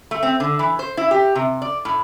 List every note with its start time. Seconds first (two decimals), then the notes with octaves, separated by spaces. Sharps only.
0.11 A3
0.23 C4
0.40 D3
0.59 E3
0.79 C5
0.97 E4
1.11 G4
1.35 C3
1.62 D5
1.85 A2